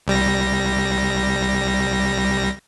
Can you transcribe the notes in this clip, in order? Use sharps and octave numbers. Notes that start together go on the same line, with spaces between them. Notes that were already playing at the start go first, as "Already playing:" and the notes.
C2 G3 A#6